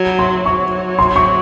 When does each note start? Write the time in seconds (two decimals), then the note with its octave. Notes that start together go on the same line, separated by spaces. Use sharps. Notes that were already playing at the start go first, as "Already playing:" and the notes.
Already playing: F#3
0.19 C6
0.45 F#3 C#6
0.99 C6
1.16 C#6